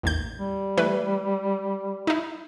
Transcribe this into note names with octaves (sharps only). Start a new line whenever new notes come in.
A1 D#2 G6
G3
E3 A3 B4
D#4 E4